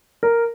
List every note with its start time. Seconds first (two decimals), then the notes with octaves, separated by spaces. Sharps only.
0.23 A#4